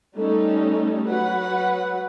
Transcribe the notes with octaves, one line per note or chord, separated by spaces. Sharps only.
G3 A3 C#4 D#4 A4
F#3 B4 F#5